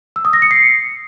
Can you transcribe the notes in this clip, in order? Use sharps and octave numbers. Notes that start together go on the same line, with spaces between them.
E6
D#6
A#6
C#7
C7